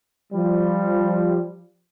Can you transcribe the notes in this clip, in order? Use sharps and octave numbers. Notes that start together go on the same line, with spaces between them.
F3 G3